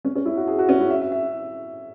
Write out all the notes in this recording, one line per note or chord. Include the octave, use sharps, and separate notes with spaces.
C#4
C#4
E4
F#4
G#4
F#4
C#4
E4
E5
E5
E5